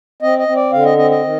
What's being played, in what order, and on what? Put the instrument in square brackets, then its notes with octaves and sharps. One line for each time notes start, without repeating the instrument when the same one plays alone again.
[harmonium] C4 D#5
D#5
C4
D5
D3 F5
D#5
C4 D#5
D#5
D#3